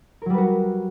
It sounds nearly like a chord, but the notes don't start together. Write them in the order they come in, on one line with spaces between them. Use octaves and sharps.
A#4 F#3 G3 B4 F#4